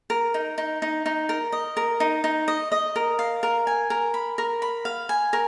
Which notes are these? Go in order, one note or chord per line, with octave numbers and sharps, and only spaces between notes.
A#4
D#4
D#4
D#4
D#4
A#4
D#5
A#4
D#4
D#4
D#5
D#5
A#4
F5
A#4
G#5
A#4
B5
A#4
B5
F5
G#5
A#4